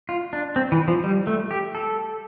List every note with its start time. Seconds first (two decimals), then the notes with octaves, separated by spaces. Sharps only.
0.09 F4
0.33 D4
0.56 C4
0.72 E3
0.88 F3
1.04 G3
1.27 A3
1.51 G4
1.75 A4